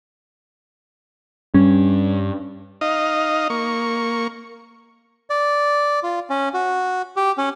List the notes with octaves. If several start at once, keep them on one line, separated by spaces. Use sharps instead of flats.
G2 G3 C#4
D#4 D#5 F5
A#3 C#6
D5
F4
C#4
F#4
G4
C#4